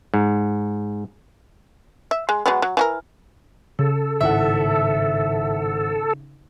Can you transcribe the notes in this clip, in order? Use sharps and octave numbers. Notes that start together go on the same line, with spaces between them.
G#2
E5
G#3
F#3 G#3 B3
F#3
E3 F#4 A#4
C#3 A4
G#1 A2 E5 F#5